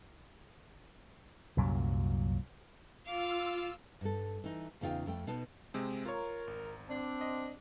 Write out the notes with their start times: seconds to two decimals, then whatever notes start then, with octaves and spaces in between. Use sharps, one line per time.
1.57 C2 F#2 A#2 F#3
3.06 F4 F5 D6 E6
4.01 G2 A4
4.44 E3 D#4
4.81 E2 C#3 D#4 F4 G5
5.06 F2 A3 G5
5.27 B2 D#4 B4 A5
5.74 C3 G#3 C4
6.05 F4 A#4 C#5
6.47 G#1
6.89 C4 D4
7.21 D#5